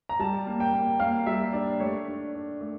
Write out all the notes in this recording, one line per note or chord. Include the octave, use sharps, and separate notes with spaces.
A#5
G3 A5
A#3
G5
A#3
A#3 F5
G3 E5
D4 D5
A3 C#5
D4
D4
A3